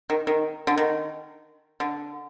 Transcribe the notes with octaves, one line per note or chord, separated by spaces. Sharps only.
D#3
D#3
D3
D#3
D3